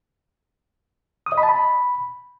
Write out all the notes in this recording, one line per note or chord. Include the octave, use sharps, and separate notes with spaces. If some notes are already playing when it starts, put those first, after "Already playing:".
D#6
D#5
B5
A5
B5